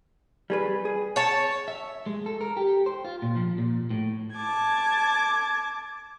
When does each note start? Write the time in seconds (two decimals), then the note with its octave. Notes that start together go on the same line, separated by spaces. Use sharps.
0.50 G3 G#4 B4
0.85 G#4
1.16 C#5 A5
1.68 E5
2.06 G#3
2.26 A4
2.41 A#4
2.57 G4
2.86 C5
3.05 F4
3.22 A#2
3.36 F3
3.58 A#2
3.90 A2
4.35 A5 D6 G#6